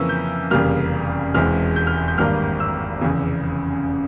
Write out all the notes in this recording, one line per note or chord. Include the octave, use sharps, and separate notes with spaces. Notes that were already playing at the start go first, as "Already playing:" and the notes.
Already playing: F2 C#3 E3 A#3 C#4 E6
G6
F1 E2 C#3 G3 A#3 F6
E1 E2 C3 E3 G#3 F6
G6
F6
G6
G6
G#1 G2 G3 A#3 F6
E6
F1 E2 C#3